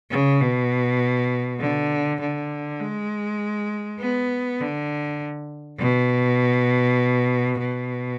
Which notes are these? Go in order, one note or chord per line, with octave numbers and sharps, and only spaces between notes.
C#3
B2
D3
D3
G#3
B3
D3
B2
B2